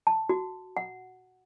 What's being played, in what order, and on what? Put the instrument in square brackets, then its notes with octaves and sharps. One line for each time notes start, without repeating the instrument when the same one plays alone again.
[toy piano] A5
F#4
F#5